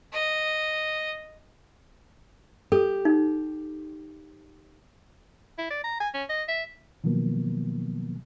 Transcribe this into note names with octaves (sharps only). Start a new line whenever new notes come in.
D#5
G4 A4
D#4
E4
D5
A#5
G#5
C#4
D#5
E5
B2 D#3 F3 F#3 A#3 B3